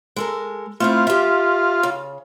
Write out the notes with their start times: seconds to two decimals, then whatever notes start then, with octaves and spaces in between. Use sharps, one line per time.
0.16 G#3 A4 A#4
0.80 A3 C4 E4 F4
1.07 G4 E5
1.83 C#3